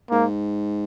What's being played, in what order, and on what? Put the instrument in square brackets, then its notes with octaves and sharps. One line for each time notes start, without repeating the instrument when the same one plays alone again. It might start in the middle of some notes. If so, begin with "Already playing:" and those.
[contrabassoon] G#2 [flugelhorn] A#3